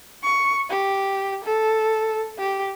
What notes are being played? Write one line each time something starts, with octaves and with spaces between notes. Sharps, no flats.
C#6
G4
A4
G4